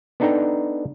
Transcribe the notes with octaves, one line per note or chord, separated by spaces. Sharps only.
B3 D4 D#4 A4 G5 A#5